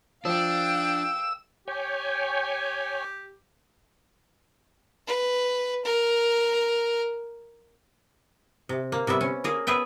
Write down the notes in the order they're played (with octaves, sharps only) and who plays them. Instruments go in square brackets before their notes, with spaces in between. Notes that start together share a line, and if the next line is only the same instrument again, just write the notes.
[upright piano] F3 [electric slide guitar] D4 [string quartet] F5 G5 [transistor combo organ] E6
[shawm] G4 [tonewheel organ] C#5 G5 G#5
[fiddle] B4
A#4
[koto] C3
A#3
C3 G3 B3 E5
C#4
A#3 G#4 A#4
B3 G#4 B4 E5 G5